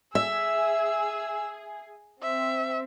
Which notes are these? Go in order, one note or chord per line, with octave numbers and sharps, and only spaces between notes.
G#4 E5 E6
C4 E5